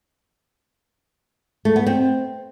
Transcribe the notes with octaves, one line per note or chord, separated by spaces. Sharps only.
A3
B3
C4